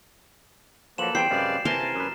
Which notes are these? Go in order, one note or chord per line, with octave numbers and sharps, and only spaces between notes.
F3 F#3 A#3 A4 B4 E7 F#7
E2 G3 C4 G5 C7
F#2 C3 G#3 B4 D5 F5
C3 E3 A#4 G#5 A5 C6 E7
F#2 B4